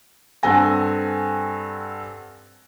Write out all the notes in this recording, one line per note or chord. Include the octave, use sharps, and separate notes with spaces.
G2 C4 A4 F#5 G#5 A#6